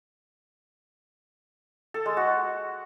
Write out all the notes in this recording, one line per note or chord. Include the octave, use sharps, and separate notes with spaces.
A4
G#3
F#4